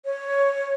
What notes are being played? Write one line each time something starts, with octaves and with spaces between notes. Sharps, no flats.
C#5